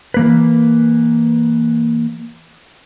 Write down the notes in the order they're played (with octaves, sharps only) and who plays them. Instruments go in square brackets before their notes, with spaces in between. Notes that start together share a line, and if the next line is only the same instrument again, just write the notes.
[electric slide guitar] E3 A#3 B4